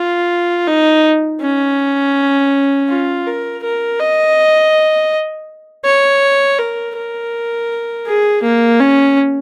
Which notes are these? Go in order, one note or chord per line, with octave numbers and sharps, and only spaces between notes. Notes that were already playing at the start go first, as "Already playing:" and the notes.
Already playing: F4
D#4
C#4
F4
A#4
A#4
D#5
C#5
A#4
A#4
G#4
A#3
C#4